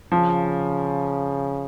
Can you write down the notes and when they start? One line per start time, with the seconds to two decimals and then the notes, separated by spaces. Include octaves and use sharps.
0.12 C#3 F3